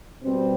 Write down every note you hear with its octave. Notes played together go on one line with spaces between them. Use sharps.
B2 G3 C4